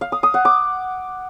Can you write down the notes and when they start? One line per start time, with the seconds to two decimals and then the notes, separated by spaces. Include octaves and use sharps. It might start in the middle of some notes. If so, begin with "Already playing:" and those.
0.01 F5
0.12 D#6
0.23 D#6
0.34 F#5
0.45 D6